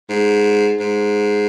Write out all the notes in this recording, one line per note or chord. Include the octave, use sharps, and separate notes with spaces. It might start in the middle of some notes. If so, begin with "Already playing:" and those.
G#2
G#2